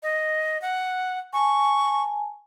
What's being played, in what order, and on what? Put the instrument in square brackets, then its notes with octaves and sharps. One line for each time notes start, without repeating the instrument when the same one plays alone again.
[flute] D#5
F#5
[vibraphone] G#5 A5 [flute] C#6